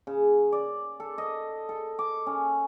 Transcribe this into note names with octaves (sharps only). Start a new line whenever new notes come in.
C#3
D5
A4
D#5
A4
D6
C#4